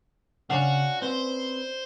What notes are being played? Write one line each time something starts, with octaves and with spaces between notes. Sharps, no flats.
C#3 C#4 D4 F#4 F5
C4 B4 C5